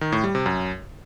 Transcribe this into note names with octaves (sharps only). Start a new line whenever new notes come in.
D#3
A2
G3
C3
F#2